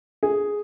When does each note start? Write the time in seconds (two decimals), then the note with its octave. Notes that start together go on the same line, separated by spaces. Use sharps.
0.23 G#4